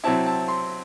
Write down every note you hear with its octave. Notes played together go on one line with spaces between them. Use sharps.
C3 F#3 C4 E4 A5
A5
C6